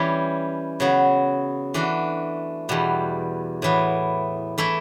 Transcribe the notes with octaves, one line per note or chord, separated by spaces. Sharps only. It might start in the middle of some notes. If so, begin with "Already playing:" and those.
Already playing: E3 G3 C#4
C#3 F#3 B3 F#4
E3 A3 D4 F#4
E2 B2 G3
A2 E3 B3
E3 A3 E4